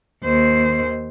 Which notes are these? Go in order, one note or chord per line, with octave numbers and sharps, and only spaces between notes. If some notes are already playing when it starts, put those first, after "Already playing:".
D#2 C5